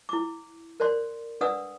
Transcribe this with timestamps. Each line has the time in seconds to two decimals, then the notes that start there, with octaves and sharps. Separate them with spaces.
0.09 E4 D6
0.80 A#4 C5 D5 C6
1.41 D4 B4 D5 F#5 D#6 E6